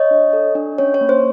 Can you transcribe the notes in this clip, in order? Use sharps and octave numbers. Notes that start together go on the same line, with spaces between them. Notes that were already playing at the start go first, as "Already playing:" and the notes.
Already playing: C#5 D#5
D4
A4
D4
C#4 C#5
C#5
A#3
C5